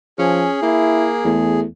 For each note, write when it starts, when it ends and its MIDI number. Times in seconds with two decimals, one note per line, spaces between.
0.19 0.47 53
0.19 0.60 61
0.19 1.60 68
0.62 1.33 58
0.62 1.10 64
1.25 1.65 40
1.25 1.66 57